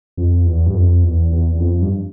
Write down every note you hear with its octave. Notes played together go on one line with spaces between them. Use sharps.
F2
E2
G2
F2
E2
E2
E2
F2
G2